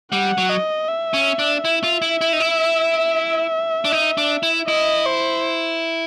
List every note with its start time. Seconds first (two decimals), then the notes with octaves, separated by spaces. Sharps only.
0.12 G3 F#5
0.38 F#3
0.50 D#5
0.88 E5
1.14 C#4
1.39 D4
1.64 E4 E5
1.84 F4
2.02 E4
2.21 E4
2.33 D#4
2.40 E4
3.85 D4
3.92 D#4
4.17 D4
4.43 E4
4.68 E4 D#5
5.06 C5